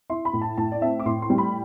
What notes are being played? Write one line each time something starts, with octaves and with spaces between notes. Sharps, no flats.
E4 C6
B5
A2
A5
A2 A5
D5
C4 E5
D6
A2 C6
C6
G3
B5